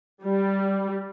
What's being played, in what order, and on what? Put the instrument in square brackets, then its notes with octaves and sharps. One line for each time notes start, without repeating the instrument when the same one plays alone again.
[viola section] G3